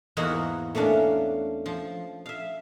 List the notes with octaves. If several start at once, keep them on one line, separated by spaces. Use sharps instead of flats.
E2 G#2 A#3 D#4 F#4 F#5
A3 A#3 C#4 D4
F3
E5 F5